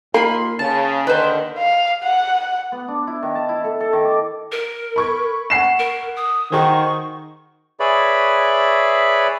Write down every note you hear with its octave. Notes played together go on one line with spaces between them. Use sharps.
D#2 A#3 F4 B5 C6
C#3 A5
D#2 D3 D#3 B4 C5
F5
F#5
B3
D4
E4
D#3
A5
E4
A4
A4
D#3
D6
A#4
B5 C#6 G#6
F#5 C7 E7
A#4
D#6
D#3 F#4 G#4 C5 C#6
G#4 B4 C#5 D5 E5 B5